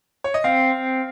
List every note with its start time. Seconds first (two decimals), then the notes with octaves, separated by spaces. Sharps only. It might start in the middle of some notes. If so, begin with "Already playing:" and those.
0.24 C#5
0.34 D#5
0.44 C4 F5